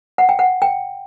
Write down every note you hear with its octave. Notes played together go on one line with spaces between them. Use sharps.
F#5
G5
F#5
G5